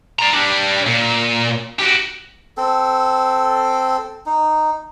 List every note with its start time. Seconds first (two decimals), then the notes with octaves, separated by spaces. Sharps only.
0.19 D5 A#5
0.33 G3 D4
0.86 A#2
1.79 F#4 G4
2.57 C4 A4
4.26 D#4